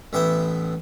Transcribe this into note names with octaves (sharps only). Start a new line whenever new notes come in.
A1 B3 E5 G5